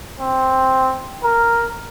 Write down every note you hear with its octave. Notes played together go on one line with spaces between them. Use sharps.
C4
A#4